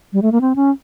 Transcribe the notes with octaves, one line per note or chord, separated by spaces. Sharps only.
G3
A3
A#3
C4
C#4